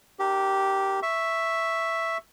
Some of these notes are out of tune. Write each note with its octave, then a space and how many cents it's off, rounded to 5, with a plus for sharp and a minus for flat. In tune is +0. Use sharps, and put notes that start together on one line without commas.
D4 +40 G4 -10 A#4 +0
E5 +0 C#6 +0